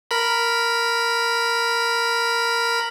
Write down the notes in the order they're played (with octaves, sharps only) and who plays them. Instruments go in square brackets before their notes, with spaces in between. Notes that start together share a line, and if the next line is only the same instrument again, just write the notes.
[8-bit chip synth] A#4 B5